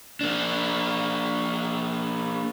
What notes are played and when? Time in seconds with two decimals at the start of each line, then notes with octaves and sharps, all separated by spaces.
0.21 A#3 D4